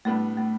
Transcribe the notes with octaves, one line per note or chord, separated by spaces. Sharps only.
A2 G3 A3 B3 D4
A3